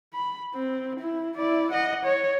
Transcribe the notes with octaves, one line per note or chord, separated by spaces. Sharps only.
B5
C4
E4
E4 D5
D#5 F#5
C#5